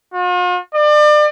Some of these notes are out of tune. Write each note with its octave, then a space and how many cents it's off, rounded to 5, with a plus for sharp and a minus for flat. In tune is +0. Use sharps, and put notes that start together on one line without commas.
F4 +45
D5 +35